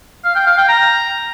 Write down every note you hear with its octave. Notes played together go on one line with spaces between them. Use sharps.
F5
G5
F5
G5
A#5